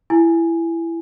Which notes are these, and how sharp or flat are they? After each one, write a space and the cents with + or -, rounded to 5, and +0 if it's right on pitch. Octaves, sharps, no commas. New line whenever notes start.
E4 +15 G#5 +0